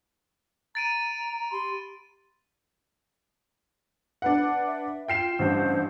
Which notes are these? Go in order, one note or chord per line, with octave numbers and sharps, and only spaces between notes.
A#5 A6 D7 D#7
G4 B5 C6
D4 B4 F#5
E5
F4 G5 C7 E7
A1 G2 C5